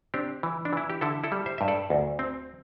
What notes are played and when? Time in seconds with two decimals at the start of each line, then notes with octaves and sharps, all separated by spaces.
0.14 C4 D4 G4
0.43 E3
0.65 D4
0.73 E3 E4
0.90 G4
1.01 D3 E4 A4
1.24 E4 A4
1.32 G3
1.46 C5 E5
1.58 G2 E5
1.68 A4 D5
1.90 D2
2.19 C4